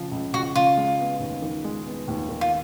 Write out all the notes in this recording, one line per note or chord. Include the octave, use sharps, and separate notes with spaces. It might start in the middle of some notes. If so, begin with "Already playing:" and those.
Already playing: C#2 C#3 F3
C#2
C#2 F#4
C#3 F4
G#3
B3
D#2
D#3
G#3
B3
D#2
D#3
F4